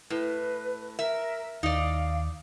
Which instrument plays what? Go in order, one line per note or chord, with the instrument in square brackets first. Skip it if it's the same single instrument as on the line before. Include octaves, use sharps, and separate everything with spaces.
[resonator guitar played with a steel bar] A2 [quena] B4
[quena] A#4 [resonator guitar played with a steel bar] E5
[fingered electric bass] D#2 [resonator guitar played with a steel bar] D#4 D5 [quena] F5